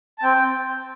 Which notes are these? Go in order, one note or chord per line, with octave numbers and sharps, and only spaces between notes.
A5
C4 G5